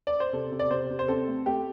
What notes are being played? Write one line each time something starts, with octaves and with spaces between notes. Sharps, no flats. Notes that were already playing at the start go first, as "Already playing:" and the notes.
D5
C5
C3 A4
C3
D5
C3 C5
C3
C5
C4 A4
A3
A3 G4